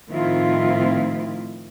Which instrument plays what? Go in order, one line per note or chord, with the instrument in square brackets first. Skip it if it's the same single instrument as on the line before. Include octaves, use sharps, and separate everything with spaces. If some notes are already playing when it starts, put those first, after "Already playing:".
[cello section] A2 D#3 F3 C4 E4 F4